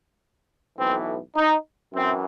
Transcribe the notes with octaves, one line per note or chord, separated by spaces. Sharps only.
B1 A2 E3 C4
D#4
F#2 E3 C4